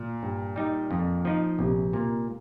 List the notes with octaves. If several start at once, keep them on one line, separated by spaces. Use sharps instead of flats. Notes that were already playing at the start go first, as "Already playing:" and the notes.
Already playing: A#2
G2
G3 D#4
F2
F3 D#4
A#1 C3
A#2 A#3